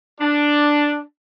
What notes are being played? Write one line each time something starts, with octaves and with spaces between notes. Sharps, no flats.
D4